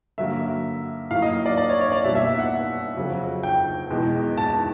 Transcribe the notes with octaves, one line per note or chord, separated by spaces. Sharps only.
G2 D3 F#3 A#3 E5
A2 F#3 A#3 F5
D#5
D5
D5
C#5
C#5
D5
B2 G3 A#3 E5
E5
E5
F#5
F2 C#3 F#3
G5
E2 B2 G#3
A5